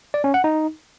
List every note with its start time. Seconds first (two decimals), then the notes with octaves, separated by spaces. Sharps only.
0.14 D5
0.24 C#4
0.34 F#5
0.44 D#4